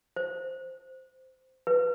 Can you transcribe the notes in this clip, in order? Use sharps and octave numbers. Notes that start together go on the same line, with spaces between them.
C5
B4